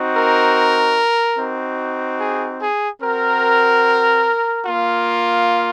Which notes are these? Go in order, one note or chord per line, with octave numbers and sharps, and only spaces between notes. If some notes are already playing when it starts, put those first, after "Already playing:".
Already playing: C4 D#4 F#4
A#4
C4 D#4 F#4
G#4
G#4
C4 F#4 A#4
A#3 F4